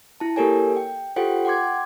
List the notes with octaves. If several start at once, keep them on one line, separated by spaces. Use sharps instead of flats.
E4 A5
A#3 G4 A4 A#4 C#5 G#5
G5
F4 G4 A4 C5 F#5 G5
F#5 G5 C6 D6 G#6